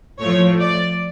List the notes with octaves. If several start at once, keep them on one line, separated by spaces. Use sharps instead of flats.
A2 F3 A3 C#5
D5